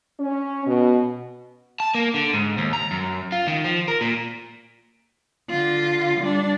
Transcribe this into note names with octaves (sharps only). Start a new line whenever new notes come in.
C#4
B2
A5
A#3
D3
G#2
D#2
A#5
F#2
F4
D#3
F3
A#4
A#2
D3 F4
G3 D4